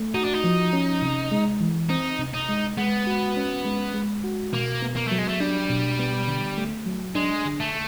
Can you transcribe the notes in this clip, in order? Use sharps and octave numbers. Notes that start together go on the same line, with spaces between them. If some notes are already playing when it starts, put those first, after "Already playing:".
Already playing: A3
D#4 F#4
D4
D#4
F3
C#4
C3
G#3
E3
C4 D#4
C3
D#4
G#3
G#3 B3
F#4
C#4
G#3
G#3
F#4
B2 A#3
B3
A#3
F#3 A3
G#3
A3
G3 D4
B2
B3
D3
A3
F#3
G#3 D4
D3
A3